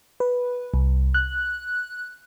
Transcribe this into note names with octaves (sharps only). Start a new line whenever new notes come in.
B4
C2
F#6